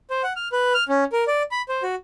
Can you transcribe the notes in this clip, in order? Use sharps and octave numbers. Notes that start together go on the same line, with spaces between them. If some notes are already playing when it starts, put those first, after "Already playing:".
C5
F#5
F6
B4
F6
C#4
A#4
D5
B5
C5
F#4